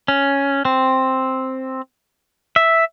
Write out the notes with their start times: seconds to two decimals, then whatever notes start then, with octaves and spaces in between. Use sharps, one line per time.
0.08 C#4
0.65 C4
2.56 E5